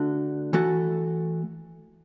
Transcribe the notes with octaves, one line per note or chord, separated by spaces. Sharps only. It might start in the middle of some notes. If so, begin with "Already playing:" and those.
Already playing: D3 A3 D4 F#4 A4
E3 A3 F#4 A4